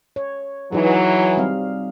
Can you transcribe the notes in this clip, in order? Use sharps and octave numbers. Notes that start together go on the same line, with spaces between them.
C#5
E3 F#3 D#4 F#4 G#4
G3 C4 F5